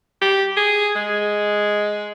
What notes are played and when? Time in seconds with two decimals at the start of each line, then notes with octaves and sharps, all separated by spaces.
0.22 G4
0.57 G#4
0.96 G#3